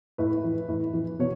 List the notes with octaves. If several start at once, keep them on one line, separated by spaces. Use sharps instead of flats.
A2 B4
E3
A2
E3
B2 C#5